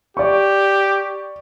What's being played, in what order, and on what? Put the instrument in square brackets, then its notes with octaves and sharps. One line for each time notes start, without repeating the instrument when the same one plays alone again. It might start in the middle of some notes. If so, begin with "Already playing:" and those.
[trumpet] G4 [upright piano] D5 C#6